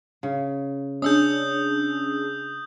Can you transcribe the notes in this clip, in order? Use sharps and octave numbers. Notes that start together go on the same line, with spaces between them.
C#3
C#4 D4 G#4 D#6 E6 G6